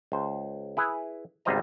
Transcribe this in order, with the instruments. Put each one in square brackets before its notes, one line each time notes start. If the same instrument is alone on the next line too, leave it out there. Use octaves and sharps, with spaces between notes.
[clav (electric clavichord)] C#2 C5
E4 G#4 B4
G#1 C#2 G3 C5 D#5 A#5